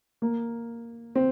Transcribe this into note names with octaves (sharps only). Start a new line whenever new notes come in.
A#3
C4